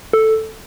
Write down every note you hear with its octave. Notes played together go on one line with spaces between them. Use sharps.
A4